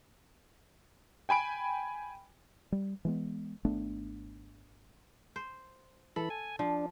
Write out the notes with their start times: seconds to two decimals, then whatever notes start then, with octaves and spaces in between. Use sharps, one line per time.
1.29 G5 G#5 B5 D7
2.72 G3
3.05 E3 G#3 B3
3.65 G#1 A3 B3 D4
5.36 C5
6.16 E3 A4 B5
6.30 G#5
6.59 F3 D4